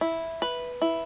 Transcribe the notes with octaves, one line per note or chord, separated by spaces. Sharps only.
E4
B4
E4